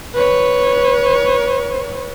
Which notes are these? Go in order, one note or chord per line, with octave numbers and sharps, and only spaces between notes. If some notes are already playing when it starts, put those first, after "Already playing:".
B4 C#5